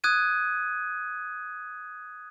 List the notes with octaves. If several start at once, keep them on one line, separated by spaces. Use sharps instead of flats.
D#6 F#6 G#6 D#7